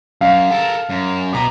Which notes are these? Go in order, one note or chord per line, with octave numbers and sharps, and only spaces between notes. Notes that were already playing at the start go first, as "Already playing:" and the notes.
F#2 F5
A4 A#4
F#2
B2 B3 A#5 D6